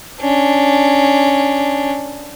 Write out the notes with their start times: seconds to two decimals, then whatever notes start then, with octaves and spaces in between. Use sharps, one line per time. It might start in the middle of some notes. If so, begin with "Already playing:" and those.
0.21 C#4 D4